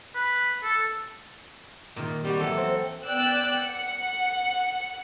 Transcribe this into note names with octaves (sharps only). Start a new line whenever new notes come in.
B4
A4
A#2 D#3
G3 C4 F#4
E3 F#3 A4
C4
B3 D5 G5 E6 F#6
F#5 C#7